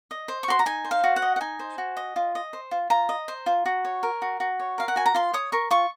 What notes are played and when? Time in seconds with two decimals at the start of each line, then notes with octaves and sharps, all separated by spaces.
0.11 D#5
0.28 C5
0.43 C#6
0.48 F#4 C6
0.59 A#5
0.66 D#4 G#5
0.84 C5
0.91 F5
1.04 F#4
1.16 F#5
1.22 D#5
1.36 F#5
1.41 D#4 G#5
1.59 C5
1.78 F#4
1.97 D#5
2.16 F4
2.35 D#5
2.53 C5
2.71 F4
2.90 F4 A#5
3.09 D#5
3.28 C5
3.46 F4
3.66 F#4
3.85 C#5
4.03 A#4
4.22 F#4
4.40 F#4
4.60 C#5
4.78 A#4 F5
4.88 F#5
4.96 F#4 G#5
5.06 A#5
5.14 F4 C6
5.33 C#5 D#6
5.52 A#4 C#6
5.71 F4 C#6